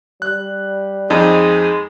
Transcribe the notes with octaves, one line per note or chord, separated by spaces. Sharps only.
G3 F#6
F2 G#3 D#4